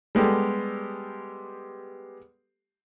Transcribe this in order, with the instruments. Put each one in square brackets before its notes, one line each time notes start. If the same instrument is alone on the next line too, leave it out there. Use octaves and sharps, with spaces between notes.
[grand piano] G3 G#3 B3 G4 A4